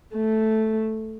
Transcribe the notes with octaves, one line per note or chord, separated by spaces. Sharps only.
A3